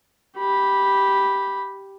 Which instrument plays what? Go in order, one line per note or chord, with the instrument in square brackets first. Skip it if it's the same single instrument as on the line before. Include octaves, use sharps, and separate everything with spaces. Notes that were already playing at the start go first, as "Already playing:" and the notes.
[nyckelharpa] G4 B5